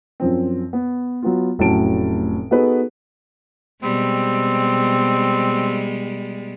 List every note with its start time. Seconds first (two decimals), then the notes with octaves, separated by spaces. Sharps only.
0.20 F#2 F3 C4
0.73 B3
1.23 F#3 B3 F4
1.59 F1 A2 F#3 C#4 A5 D7
2.51 B3 D#4 F#4 G#4 A4 B4
3.83 B2 G3 G#3 C4